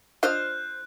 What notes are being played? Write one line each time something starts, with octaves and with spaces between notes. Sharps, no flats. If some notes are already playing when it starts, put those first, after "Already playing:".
D4 F4 C5 D#5 F6 F#6